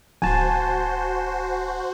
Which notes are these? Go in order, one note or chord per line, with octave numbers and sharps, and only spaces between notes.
D1 F#4 C5 G#5 A5